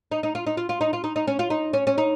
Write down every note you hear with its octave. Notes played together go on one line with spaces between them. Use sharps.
D#4
D#4
F4
D#4
F4
F4
D#4
F4
D#4
D#4
C#4
F4
D#4
C#4
C#4
D#4